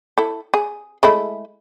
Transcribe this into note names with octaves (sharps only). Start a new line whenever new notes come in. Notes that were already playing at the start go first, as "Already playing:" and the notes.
E4 A4
G#4
G#3 A3 E4